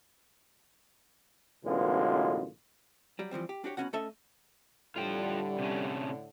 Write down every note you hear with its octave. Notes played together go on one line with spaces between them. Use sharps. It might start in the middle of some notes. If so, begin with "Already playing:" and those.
A1 F#2 B2 D3 G#3 F4
F#3 G3
E3 F3 G3 C4
G4
D4 F#4 G4 C#5
C2 B2 G3 C#4 F#4 F#5
A3 C#4 A4 D#5 E5
A2 D3 G3 F4 G5
C3 C#4